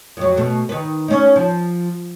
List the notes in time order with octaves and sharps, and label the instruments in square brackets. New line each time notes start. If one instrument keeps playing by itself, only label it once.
[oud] F2 F#3
B2 A3
D#3 B4
C#4 D#4
F3